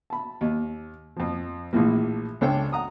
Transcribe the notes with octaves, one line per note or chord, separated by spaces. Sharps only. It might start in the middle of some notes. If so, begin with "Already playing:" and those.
A5 B5
D#2
F2 F3
A#1 A2 E3 F3 A#3
C#2 D4 A4 C5 C#5 G5
F#5 A#5 D#6